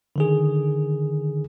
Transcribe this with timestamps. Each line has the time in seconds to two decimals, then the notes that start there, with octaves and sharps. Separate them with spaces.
0.16 D3 D#3 G#4